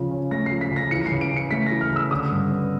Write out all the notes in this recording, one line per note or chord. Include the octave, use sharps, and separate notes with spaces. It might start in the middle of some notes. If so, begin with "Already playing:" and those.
Already playing: C#3 F3
C#4
A3 A#6
F3 C7
B6
C#3
A#6
E3 C#7
C#7
C7
C#3
D7
C#4 C#7
A3 B6
A#6
E3
F6
C#3
E6
D3 D#6
G2
B3